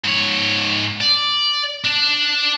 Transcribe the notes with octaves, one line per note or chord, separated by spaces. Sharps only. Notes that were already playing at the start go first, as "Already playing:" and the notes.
G#2 C#5
D5
D4